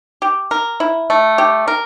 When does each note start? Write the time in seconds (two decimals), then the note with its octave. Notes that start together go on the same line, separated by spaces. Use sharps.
0.22 G4
0.51 A#4
0.80 E4
1.10 A3
1.38 G4
1.68 A#4